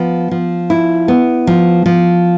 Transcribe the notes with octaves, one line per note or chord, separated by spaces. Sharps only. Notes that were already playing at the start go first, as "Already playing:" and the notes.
Already playing: F3 B3
F3
E4
B3
F3
F3